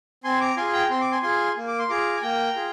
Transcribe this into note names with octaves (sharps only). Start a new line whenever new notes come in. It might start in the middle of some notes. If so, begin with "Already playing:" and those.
C4 G#5 C6
A#5 D6
F4 G#4 G#5 C6
G5 A#5
C4 C6
D6
G#5 C6
F4 G#4 G#5 C6
A#3
D6
C6
F4 G#4 A#5 D6
G#5
A#3 G5 A#5
F4 G#4